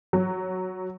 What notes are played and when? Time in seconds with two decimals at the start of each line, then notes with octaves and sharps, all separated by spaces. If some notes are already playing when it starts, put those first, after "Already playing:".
0.13 F#3